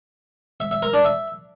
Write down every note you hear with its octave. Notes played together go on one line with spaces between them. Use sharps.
E5
E5
A#4
D4
E5